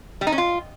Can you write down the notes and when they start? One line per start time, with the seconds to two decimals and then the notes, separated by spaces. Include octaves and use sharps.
0.21 G3
0.27 D#4
0.32 C#4
0.38 F4